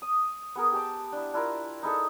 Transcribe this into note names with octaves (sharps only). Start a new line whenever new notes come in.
D#6
B3 G#4 A#4
G4 G5 A5 D6
D4 E4
D4 E4 F4 A#4
D#4 E4 G#4 A4